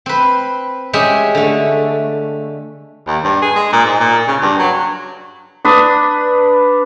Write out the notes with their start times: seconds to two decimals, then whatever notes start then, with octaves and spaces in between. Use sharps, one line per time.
0.06 C4 B4
0.93 G#3 C#4 G4 G#4 E5
1.35 D3 A3
3.07 D#2
3.24 G2
3.42 G#4
3.55 G#3
3.73 A#2
3.85 G#2
4.00 A#2
4.27 C#3
4.41 G2
4.59 F#3
5.65 D4 B4 D#6